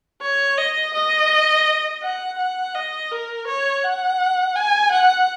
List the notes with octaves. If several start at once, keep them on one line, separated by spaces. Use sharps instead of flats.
C#5
D#5
D#5
F#5
F#5
D#5
A#4
C#5
F#5
G#5
F#5